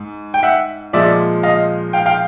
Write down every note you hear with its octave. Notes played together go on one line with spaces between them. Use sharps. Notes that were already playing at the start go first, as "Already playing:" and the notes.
Already playing: G#2
G5
E5 F#5
A#2 F3 G#3 D5 E5
D#5 F5
F5 G5
F5 G5